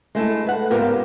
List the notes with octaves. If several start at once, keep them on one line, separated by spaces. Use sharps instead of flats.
G#3 A3 E4 A4
A4 B4 F#5
G#2 C#3 B3 F4 G4 A#4